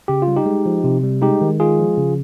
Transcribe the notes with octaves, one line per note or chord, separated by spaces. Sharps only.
C#3 G4
F4
G3
D#4 G4
G#3
F3
C3
G3
G#3 D#4 G4
D#3
G#3 F4 G#4
F3
C#3